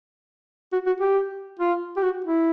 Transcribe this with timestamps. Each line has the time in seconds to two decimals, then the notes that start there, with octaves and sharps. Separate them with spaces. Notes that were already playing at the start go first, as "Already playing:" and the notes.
0.73 F#4
0.86 F#4
1.00 G4
1.59 F4
1.97 G4
2.03 F#4
2.25 E4